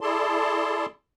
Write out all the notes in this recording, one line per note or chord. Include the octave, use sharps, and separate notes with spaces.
E4 G#4 A4 D5 A5 C6